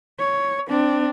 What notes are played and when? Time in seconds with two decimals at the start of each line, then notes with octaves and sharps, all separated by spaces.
0.19 C#5
0.67 C4 D4